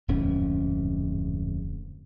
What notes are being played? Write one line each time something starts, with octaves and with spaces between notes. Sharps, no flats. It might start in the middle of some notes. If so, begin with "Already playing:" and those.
D1 F2 G#2 C#4